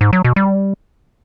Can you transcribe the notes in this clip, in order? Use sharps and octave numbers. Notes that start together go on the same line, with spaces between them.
G#2
F#3
B2
G3